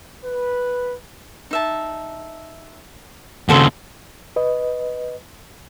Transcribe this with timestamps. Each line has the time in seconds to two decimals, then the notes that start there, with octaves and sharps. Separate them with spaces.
0.24 B4
1.51 D#4 E5 A5
3.49 D#2 C#3 F#4 A4 C5
4.36 B4 D#5